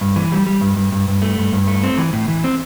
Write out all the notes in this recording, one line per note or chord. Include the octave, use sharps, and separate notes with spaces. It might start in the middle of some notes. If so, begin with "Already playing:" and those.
G2
E3
G3
G3
G2
G2
G2
G2
A3
G2
G2
A3
C4
E3
A2
E3
C4